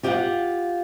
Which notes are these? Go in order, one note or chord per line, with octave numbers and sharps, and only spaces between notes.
F4 G4 D5 D#5 F5 F#5